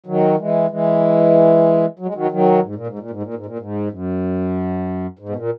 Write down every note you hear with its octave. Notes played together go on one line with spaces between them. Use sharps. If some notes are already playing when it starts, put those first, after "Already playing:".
D#3 F#3
E3 G#3
E3 G#3
F#3
G#3
D#3 F#3
D#3 F#3
G#2
A#2
G#2
A#2
G#2
A#2
G#2
A#2
G#2
F#2
G#2
B2
A#2